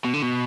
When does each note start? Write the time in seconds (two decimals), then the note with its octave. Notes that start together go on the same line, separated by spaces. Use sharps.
0.05 B2
0.14 D3
0.22 B2